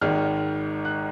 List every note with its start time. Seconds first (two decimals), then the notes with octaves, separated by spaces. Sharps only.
0.01 G#1 G#2 D#3 F6
0.85 F#6